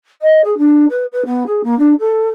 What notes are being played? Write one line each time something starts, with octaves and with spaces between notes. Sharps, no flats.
D#5
G#4
D4
B4
B4
B3
G#4
A#3
D4
A4